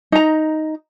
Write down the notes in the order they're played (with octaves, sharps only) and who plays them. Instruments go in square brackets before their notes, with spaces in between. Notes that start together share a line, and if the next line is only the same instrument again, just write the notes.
[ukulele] D#4 A#5